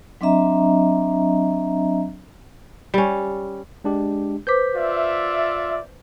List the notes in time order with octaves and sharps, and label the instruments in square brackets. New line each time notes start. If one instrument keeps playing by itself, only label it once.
[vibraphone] F#3 C4 D4 D#5 E5 A#5
[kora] G3 C#4
[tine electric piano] G#3 D4 G4
[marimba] B4 C5 D6 [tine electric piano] G6 B6
[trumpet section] F4 D5 E5